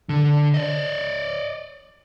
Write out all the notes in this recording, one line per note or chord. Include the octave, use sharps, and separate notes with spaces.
D3
D5 D#5